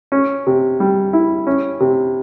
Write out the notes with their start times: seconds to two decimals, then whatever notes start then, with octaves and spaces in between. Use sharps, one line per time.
0.12 C#4
0.47 C3
0.80 G3
1.13 E4
1.47 C#4
1.80 C3